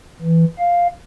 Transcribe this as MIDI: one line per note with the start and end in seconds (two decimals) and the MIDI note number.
0.22 0.44 52
0.59 0.87 77